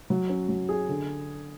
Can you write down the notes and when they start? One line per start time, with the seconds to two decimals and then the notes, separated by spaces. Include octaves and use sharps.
0.10 F#3
0.29 C#4
0.49 F#3
0.69 G#4
0.89 D3